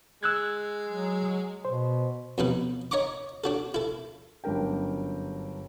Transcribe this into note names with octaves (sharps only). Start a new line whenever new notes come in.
G#3 E6 F#6 G#6
F#3
B2 C5
F2 B2 D#4 B4
C#5 D#5 A#5 C#6 D6
D4 F#4 A4
E4 A4
G1 F#2 D4 A#4 G5